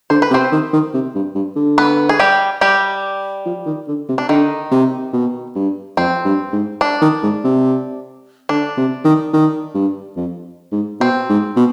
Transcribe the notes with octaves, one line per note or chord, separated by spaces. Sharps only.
D3 C5
B4
C3
C4 C5
D#3
D#3
C3
G2
G2
D3
B3 B4
G#4
G3 G4
G3 G4
F3
D#3
D3
C3
D4
D3 D#3 D#4
C3
B2
G2
F2 C4
G2
G#2
D4
D#3
G#2
C3
D3 D4
C3
D#3
D#3
G2
F2
G#2
B2 C4
G#2
B2